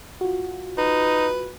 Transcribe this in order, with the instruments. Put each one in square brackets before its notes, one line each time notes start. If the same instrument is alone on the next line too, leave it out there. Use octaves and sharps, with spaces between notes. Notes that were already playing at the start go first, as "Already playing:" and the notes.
[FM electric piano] F4 F#4
[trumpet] D#4 [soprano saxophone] B4